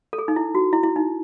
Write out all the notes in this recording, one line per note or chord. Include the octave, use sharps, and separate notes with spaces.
A4
G#4
D#4
E4
F#4
E4
E4
D#4